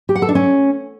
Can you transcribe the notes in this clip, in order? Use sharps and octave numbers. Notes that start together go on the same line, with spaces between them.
G4
F#5
A4
D4
C#4